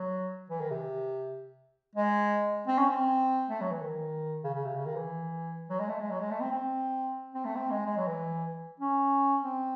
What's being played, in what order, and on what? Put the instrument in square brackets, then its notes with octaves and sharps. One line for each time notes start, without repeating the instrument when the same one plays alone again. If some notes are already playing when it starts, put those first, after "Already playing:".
Already playing: [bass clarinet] F#3
E3
D#3
C3
G#3
C4
C#4
C4
A3
F#3
E3
D#3
C#3
C#3
C3
C#3
D#3
E3
F#3
G#3
A3
G#3
F#3
G#3
A3
C4
C4
C4
A3
C4
G#3
G#3
F#3
E3
C#4
C4